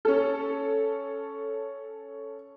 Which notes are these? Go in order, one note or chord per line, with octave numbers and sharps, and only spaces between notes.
C#4 A4